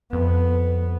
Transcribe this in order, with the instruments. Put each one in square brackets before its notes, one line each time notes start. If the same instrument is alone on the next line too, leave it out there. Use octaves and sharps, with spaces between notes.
[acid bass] F2 [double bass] B3